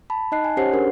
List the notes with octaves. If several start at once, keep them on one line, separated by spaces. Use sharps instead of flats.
A5 B5
D#4 D#5 A5 F#6 C7
G#5
C#4 G4 C5 C#5 F#5 C7
C#4 D4 F#4 G#4 A#4 C5